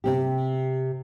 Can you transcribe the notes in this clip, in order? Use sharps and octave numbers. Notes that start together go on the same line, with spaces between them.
C3 C4 G4